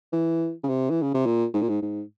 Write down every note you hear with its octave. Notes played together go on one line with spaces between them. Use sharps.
E3
C#3
C3
E3
C#3
C3
A#2
G#2
A#2
G#2
G#2